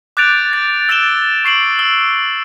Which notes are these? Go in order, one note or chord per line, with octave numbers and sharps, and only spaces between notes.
D6 F#6 G6 A6 D7 F7
A6
E6 A6 D7 E7 G7
C#6 C7 D7 F#7
E6 G7